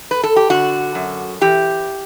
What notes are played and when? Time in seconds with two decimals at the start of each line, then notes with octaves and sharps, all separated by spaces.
0.11 B4
0.23 A4
0.36 G4
0.50 D3 F#4
0.95 F#2
1.41 E3 G4